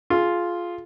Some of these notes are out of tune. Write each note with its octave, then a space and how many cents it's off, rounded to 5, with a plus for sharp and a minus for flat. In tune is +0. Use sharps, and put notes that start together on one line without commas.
F4 +0 G#4 +20